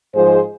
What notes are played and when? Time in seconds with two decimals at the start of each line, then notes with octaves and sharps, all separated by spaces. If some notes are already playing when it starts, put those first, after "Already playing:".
0.14 G#2 F3 G#3 G#4 C5